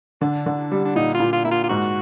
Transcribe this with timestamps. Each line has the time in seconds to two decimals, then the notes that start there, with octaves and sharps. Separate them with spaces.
0.21 D3 D4
0.46 D3
0.72 G3
0.85 D4
0.95 A#2 D#4
1.15 F4
1.20 A#2
1.33 F4
1.45 A#3 E4
1.51 F4
1.64 F4
1.69 G#2 F#4